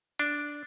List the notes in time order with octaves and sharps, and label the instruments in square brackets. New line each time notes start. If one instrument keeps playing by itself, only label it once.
[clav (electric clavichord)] D4